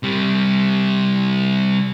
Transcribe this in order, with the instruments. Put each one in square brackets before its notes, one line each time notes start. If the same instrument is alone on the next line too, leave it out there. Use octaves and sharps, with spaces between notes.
[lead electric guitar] C3 G3